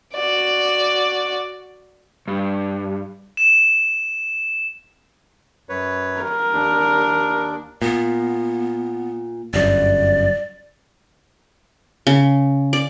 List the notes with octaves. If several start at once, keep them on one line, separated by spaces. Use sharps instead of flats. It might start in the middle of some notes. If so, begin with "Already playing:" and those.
F#4 D5
G2
E7
F#2 B4 C#5
A#4
D#2 D4
A#2 B3
G1 F#2 D5
C#3
D5